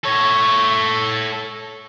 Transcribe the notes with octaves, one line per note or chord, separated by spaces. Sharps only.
A4 C#5